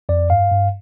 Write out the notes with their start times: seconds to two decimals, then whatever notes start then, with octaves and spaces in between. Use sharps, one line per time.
0.09 F2 D5
0.30 G2 F5
0.51 G2